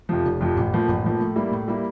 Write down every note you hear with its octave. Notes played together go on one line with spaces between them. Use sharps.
F2 C3 F3
F1
F2 C3 F3
A1
A2 F3 A#3
A1
A2 F3 A#3
A2
G3 A#3 E4
A2
G3 A#3 E4